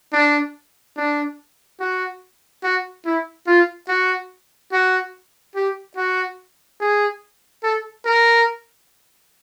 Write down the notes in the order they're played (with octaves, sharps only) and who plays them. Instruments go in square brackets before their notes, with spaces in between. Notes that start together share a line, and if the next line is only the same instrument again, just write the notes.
[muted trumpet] D4
D4
F#4
F#4
E4
F4
F#4
F#4
G4
F#4
G#4
A4
A#4